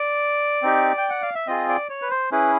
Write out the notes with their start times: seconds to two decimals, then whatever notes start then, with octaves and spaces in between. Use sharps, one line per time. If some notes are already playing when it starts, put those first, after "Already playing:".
Already playing: D5
0.63 C4 D#4 G4
0.98 G5
1.10 F#5
1.22 F5
1.35 E5
1.47 C4 F4 G#4 D#5
1.69 D5
1.89 C#5
2.02 B4
2.11 C5
2.32 C#4 E4 G#4 B4